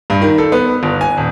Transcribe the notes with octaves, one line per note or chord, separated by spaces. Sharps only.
G2
D#3
A4
B3
G1
G#5
D#1